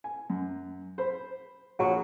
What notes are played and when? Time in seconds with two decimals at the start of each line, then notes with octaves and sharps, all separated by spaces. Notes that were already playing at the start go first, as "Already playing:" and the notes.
0.04 G#5
0.30 F#2
0.98 C5 B5
1.79 A#1 F#3 G#4 C#6